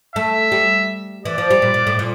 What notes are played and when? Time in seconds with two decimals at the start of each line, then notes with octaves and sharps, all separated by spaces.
0.16 A3 E5
0.52 G3
1.25 E3 D5
1.38 F3
1.50 G3
1.62 A#2
1.74 A#2
1.87 A2
1.99 A#2